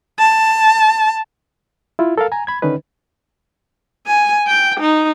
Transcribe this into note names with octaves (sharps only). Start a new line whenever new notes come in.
A5
E4 F4
A4 A#4 F5
G#5 A#5
B5 G#6
D3 D#3 C#4 D#4 B4
G#5
G5
D#4